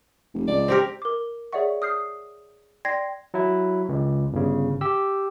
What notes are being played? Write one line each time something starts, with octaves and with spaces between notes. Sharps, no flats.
F1
C#2 D5
C4 G4 A#4
A#4 D6
G#4 C#5 D5 E5 F#5 C#6
D#6 F6 G6 C7
D5 G5 C6 G#6 A#6 C7
F#3 E4
C#2
G1 C#3
G4 E6